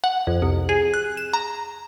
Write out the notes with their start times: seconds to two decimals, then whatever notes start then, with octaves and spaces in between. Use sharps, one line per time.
0.04 F#5
0.27 F2
0.42 C2
0.69 G#4
0.94 F#6
1.17 E7
1.33 A#5